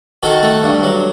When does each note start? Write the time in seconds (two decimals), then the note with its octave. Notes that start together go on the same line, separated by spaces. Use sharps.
0.23 D#3 F#4 A4
0.43 A3
0.63 G2
0.83 F#3